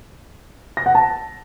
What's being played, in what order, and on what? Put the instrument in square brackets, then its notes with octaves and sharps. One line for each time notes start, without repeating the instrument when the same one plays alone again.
[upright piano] A#6
F#5
A5